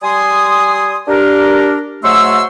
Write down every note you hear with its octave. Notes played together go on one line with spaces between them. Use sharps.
G3 G#5 C6 D#6
D4 G4 A#4
G#2 F#3 A3 C6 C#6 E6